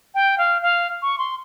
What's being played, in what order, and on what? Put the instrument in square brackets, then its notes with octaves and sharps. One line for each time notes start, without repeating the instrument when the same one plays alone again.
[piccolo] G5
F5
F5
C#6
C6